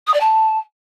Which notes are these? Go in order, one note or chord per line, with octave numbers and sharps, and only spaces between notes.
D#6
D5
A5